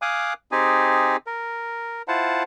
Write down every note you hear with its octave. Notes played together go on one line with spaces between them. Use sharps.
F5 G#5 D6 D#6 F#6
C4 D#4 G4 G#4 G#5
A#4
E4 F4 C5 F#5 A5